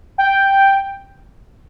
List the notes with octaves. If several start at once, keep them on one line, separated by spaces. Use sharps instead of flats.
G5